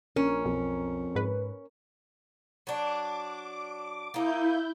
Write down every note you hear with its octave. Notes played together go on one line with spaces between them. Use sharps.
A#1 C#4 A#4
B1 F2
G#2 B4
F#3 D4 D6
A#3 D#4 E4 G6